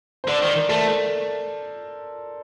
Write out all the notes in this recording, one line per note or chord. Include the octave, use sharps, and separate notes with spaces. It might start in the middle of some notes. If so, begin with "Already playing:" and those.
C5
D3 D5
D#3 C5
A#4
A3 A4